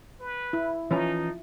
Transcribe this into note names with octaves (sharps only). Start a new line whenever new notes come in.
B4
E4
E3 F3 C#4 D#4 A#5